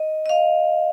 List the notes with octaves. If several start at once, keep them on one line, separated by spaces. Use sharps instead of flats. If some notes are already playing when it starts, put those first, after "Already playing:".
Already playing: D#5
D#5
F5